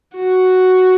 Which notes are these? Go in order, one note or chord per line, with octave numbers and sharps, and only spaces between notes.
F#4